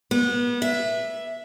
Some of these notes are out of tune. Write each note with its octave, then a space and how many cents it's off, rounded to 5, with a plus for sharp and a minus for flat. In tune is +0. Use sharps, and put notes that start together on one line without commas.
B3 -30
E5 +5